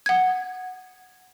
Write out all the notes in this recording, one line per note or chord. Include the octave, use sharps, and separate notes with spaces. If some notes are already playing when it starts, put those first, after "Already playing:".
F#5 G#6